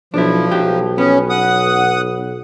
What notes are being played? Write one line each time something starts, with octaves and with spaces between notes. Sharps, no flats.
B1 F3 D4 E4
B1 F#3 G4
B3 C#4
F#5 D#6